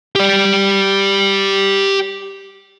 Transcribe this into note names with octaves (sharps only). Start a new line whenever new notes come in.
G4 D5